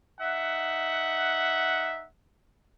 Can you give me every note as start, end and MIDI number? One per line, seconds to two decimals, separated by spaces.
0.20 2.05 63
0.20 2.05 76
0.20 2.05 78